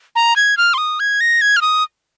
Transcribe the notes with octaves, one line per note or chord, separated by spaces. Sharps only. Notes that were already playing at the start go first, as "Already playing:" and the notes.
A#5
G#6
F6
C6
D#6
G#6
A#6
G#6
F6
D#6